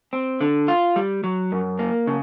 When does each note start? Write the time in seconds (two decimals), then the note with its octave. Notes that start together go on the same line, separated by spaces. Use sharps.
0.13 C4
0.41 D3
0.68 F4
0.96 G3
1.24 F#3
1.52 F#2
1.79 A#3
2.07 C#3